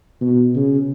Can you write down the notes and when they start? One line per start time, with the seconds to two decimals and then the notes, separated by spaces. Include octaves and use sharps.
0.21 B2
0.55 C#3